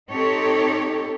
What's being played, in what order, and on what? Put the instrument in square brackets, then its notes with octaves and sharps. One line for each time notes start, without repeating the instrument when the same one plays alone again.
[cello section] C4 D#4 G4 A4 C#5